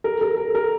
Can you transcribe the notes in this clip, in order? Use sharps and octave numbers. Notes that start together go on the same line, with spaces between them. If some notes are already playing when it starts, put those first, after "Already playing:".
A#4
A#4
A#4
A#4